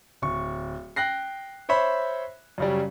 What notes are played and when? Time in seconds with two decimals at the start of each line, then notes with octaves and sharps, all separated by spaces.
0.22 D1 C#6
0.96 G5 F#6 A#6 C7
1.69 C5 C#5 E5 B5
2.58 F#2 C#3 G3